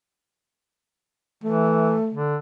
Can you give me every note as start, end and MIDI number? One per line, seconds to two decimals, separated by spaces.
1.44 1.96 52
1.44 2.18 57
2.14 2.36 50